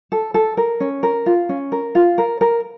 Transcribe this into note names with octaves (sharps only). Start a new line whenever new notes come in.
A4
A4
A#4
C#4
A#4
F4
C#4
A#4
F4
A#4
A#4